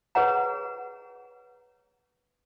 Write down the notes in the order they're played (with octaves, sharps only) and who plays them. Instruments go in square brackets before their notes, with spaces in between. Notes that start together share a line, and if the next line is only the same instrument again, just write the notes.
[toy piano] G#4 B4 C#5 F#5 A#5